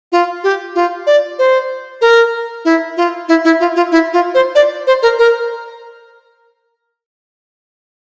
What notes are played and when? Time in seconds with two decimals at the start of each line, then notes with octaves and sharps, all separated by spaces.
0.12 F4
0.44 G4
0.75 F4
1.07 D5
1.39 C5
2.01 A#4
2.65 E4
2.97 F4
3.29 E4
3.45 E4
3.60 F4
3.76 F4
3.92 E4
4.13 F4
4.34 C5
4.55 D5
4.87 C5
5.03 A#4
5.19 A#4